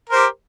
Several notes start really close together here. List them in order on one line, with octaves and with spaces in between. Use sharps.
A#4 C5 G4